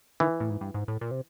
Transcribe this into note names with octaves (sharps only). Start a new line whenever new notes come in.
D#3 E3
A2
G#2
G2
G#2
A2
A#2
C3